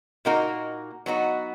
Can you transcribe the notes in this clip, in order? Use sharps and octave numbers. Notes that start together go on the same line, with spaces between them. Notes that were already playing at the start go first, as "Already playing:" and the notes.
A#2 A#3 D#4 F#4 A#4
F#3 B3 D#4 F#4